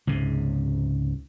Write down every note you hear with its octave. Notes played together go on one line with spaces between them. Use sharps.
C#2 G#2 C3